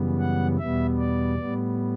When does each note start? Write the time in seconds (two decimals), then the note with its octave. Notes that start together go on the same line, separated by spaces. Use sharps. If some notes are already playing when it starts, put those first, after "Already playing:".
Already playing: F#2 C#3 E3 G3 B3
0.19 F#5
0.58 E2 B2 G3 B3 E5
0.98 D5
1.38 A2 G3 B3